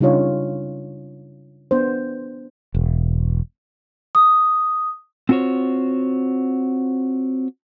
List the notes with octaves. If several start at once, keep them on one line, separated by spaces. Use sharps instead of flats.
C#3 G3 D4 D#4 F4 C#5
B3 D4 C5
E1
D#6
C4 F4 F#4 C5 C#5